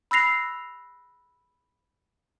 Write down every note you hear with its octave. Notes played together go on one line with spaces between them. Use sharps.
B5 E6 F#6 A#6 C7 F7